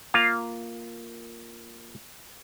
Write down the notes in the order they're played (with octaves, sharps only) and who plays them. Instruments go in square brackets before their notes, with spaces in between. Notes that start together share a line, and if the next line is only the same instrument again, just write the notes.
[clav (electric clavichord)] A#3 F4 F5